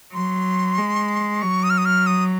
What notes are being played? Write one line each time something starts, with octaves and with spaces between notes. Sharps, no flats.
F#3 C6
G#3
F#3 C#6
D#6
F6
D#6
F6
D#6